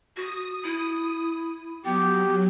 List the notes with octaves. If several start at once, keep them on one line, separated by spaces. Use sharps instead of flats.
F#4 D#6
E4
F#3 B3 G4